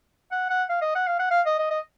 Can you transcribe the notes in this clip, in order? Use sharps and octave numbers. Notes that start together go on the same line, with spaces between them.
F#5
F#5
F5
D#5
F#5
F5
F#5
F5
D#5
D#5
D#5